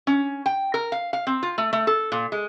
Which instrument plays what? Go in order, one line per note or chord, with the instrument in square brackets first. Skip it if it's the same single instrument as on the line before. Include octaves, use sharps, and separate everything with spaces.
[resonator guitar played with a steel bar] C#4
G5
A#4
F5
F5
C4
F4
A3
A3
A4
A#2
G#3